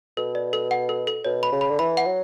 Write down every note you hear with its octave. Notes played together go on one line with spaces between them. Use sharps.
B2 A4
D5
A4
F#5
A4
A4
B2 C#5
B5
C#3
B5
D3
E3 B5
F#5
F#3